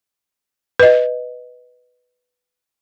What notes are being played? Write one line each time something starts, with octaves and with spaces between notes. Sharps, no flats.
B4 D#5